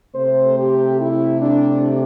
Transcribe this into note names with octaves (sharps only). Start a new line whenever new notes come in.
C3 A3 C5
G4
E4
D4